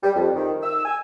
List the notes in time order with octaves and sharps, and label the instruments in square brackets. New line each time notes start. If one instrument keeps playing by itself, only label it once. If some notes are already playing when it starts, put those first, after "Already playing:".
[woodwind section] G3
F2
D#3
E6
G#5